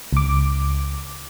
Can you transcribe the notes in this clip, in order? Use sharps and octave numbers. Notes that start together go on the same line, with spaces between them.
C#2 D6